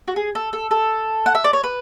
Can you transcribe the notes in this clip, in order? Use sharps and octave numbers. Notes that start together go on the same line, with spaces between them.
F#4
G#4
A4
A4
A4
F#5
E5
D5
C#5
B4